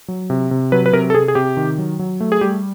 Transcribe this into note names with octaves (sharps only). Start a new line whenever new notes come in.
F#3
C3
C3
F#3 B4
B4
C3 A#4
A4
C3 G#4
G#4
C3 G4
D#3
F#3
F#3
A3
G#4
G3 G4